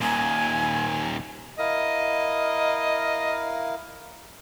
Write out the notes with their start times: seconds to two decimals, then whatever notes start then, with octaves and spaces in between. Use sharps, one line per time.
0.01 D#2 A#2 G#5
1.59 E4 A#4 D#5 F5